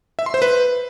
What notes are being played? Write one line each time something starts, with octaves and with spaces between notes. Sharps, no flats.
E5
C6
C5
B4